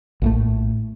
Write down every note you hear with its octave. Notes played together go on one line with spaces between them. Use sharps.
A#1 A2 A3